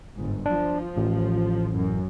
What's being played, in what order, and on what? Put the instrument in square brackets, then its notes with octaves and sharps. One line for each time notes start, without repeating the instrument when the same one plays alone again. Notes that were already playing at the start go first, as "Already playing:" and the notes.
[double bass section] G1 G#2
[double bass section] F3 [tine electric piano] D4
[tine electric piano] A1
[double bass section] F#2